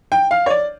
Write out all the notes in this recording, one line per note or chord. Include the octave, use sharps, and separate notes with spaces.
G5
F5
C#5
D5